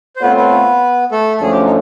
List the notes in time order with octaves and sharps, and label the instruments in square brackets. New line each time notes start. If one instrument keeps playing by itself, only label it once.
[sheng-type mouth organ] C5
[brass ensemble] A3 C4 F4 A4 C#5 [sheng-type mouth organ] B3 B4
[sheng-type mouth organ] B3 B4
A3 A4
A4
[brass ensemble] F#2 D3 F3 A3 C#4 [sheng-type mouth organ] G#4
[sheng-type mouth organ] G4
D#4